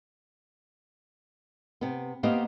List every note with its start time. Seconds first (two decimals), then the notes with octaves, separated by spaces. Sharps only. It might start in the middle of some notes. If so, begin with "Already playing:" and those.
1.81 C3 B3
2.23 A#3 B3 G4 C5 D#5 F5